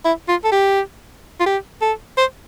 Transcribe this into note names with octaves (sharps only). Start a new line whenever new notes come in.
E4
F4
A4
G4
F4
G4
A4
C5